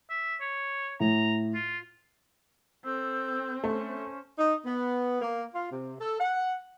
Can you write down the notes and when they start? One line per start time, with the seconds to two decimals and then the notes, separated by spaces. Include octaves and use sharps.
0.10 E5
0.41 C#5
1.00 A2 A#5
1.54 F4
2.84 C4 A4 E6 G6
3.64 A3 C#4 C5
4.38 D#4
4.65 B3
5.21 A#3
5.55 F4
5.70 C3
6.00 A4
6.19 F#5